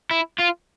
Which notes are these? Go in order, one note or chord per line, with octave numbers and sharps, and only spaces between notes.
E4
F4